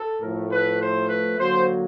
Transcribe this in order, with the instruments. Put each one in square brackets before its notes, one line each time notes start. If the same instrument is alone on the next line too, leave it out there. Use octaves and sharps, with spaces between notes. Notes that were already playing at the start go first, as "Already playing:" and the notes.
Already playing: [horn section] A4
A2 F3 A3 A#4
B4
C5
B4
D3 F#3 A#3 C5